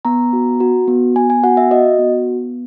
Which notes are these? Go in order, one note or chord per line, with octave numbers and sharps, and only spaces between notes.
B3 A#5
F#4
F#4
B3
B3 G#5
G#5
F#4 F#5
E5
F#4 D#5
B3